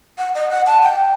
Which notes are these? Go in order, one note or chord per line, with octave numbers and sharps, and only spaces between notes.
F#5
D#5
F#5
A5
G5